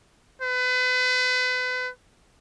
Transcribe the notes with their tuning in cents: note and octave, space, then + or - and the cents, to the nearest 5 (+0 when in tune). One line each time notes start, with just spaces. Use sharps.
B4 +35